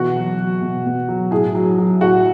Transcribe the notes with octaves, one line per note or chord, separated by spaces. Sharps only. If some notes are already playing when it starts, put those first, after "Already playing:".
Already playing: B2 E3 F#4
F#3
F#3
B2
B2
F#3
A2 G#4
F#3
F#3
A2 F#4